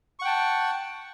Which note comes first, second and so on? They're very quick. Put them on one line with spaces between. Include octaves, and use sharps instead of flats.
C#6 F#5 G5 A5